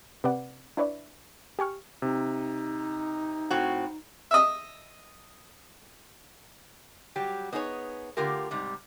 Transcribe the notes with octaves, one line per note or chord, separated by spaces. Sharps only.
C3 B4 D5 F#5
D4 E4 B4 C#5 D5
G4 G#5 C#6 F6
C3 D#4
A2 C4 F#4
D#5 E5
F#3 G3 G4
B3 D#4 G#4 C5 C#5
D3 A3 F4 G4 A#4
G#2 C3 G3